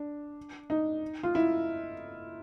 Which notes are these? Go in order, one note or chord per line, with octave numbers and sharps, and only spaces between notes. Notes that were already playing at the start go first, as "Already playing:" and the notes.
Already playing: D4
D#4
F4
E4